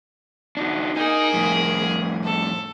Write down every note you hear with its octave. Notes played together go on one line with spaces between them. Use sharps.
D4 D#4 F#4
A#3 D#4 G#4
F2 A2
A4